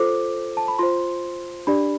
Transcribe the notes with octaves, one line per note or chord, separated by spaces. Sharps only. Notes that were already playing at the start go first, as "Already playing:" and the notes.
Already playing: F4 A4 C5 D6
A5
B5
F4 C5 C6
D4 G4 D5 B5